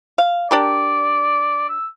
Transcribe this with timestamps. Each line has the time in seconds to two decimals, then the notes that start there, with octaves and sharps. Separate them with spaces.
0.18 F5
0.51 D4 G4 A#4 D5
1.69 E6